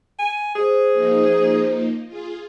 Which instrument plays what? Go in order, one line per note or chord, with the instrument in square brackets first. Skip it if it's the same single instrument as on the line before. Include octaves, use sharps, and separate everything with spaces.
[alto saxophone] G#5
[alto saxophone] G#4 [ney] C5
[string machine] F3 A#3 D#4
F4 G#4